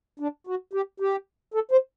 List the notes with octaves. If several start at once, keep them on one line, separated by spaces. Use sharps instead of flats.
D4
F#4
G4
G4
A4
C5